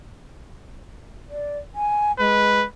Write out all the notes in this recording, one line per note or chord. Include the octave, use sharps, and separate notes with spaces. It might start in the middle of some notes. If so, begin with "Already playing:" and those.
D5
G#5
G#3 B4